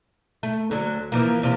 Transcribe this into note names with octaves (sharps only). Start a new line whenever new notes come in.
A3
D2 D3 F#3
E3 F3 A#3
E2 C3 F4